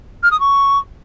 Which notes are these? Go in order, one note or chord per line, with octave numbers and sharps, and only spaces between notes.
F6
D#6
C#6